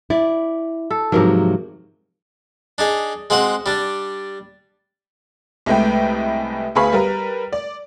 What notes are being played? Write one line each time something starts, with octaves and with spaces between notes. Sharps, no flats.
E4 D5
A4
G#2 C3 F3 F#3 A#4
D4 D#4 G#4
G#3 C4 F#4 F#5
G3 D4
C2 G#3 A3 B3 B4 G5
D2 B3 G#4 F5 B5
G3 A#4 B4
D5